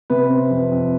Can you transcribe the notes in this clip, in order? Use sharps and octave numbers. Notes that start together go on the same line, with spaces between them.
C3 B4
C4
F2
F2